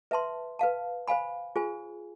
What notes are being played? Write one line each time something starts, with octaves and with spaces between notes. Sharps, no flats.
B4 E5 A5 C6
B4 F5 A5
C5 F5 G#5 B5
F4 G#4 C5 G#5